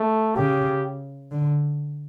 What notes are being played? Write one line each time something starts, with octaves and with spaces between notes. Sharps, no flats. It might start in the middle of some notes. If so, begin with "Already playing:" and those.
Already playing: A3
C#3 G4
D3